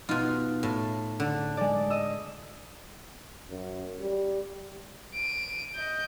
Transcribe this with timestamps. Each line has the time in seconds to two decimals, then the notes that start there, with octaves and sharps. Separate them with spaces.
0.09 B2 D#4 F4
0.63 A2
1.20 D3
1.57 G#3 D5
1.90 D#5 D#6 E6
3.50 F#2
3.99 G3
5.14 D7 D#7
5.76 D#5 G6